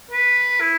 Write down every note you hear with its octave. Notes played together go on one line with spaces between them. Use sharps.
B4
E4